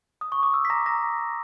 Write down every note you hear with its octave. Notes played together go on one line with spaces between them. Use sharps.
D#6
C#6
D6
E6
B6
A#5 A#6
A#5 A#6